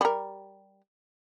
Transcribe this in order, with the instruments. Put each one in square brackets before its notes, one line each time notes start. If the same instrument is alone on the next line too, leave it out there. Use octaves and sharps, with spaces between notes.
[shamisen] G3 A#4